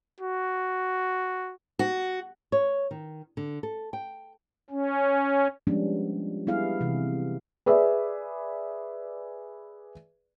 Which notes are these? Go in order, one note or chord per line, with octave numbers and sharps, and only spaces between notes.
F#4
F#4
C#5
D#3
D3
A4
G5
C#4
F3 G3 G#3 B3 C#4 D4
G3 B3 E4 G#4 F5
C3 E3
G#4 B4 D5 E5